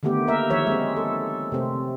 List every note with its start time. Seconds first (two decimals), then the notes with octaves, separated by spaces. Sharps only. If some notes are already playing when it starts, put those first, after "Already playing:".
0.03 D3 D#3 A3 B3 G4
0.27 A#3 A#4 E5
0.50 D#3 F3 C#5 E5
0.67 G#3 C4
0.97 A4
1.52 C3 A3 C4